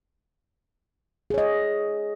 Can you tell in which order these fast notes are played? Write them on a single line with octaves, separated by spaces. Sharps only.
G#4 C#5 D#5